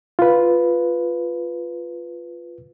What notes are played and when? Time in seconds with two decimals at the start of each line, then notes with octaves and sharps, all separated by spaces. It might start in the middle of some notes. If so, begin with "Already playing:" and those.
0.19 F4 B4